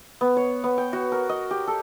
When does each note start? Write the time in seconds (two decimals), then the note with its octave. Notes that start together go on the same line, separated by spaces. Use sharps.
0.21 B3
0.37 C#5
0.64 B3
0.78 G5
0.93 F#4
1.12 A#4
1.29 D#5
1.51 G4
1.67 A4